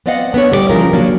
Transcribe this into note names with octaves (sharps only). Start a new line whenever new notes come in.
B3 C4 D5 D#5 F5 F#5
B3 D4 C#5
D2 A2 G3 G4 G#4 D5
C#3 E3 F3 G#3 F4 A#4
D3 F#3 A#3 D4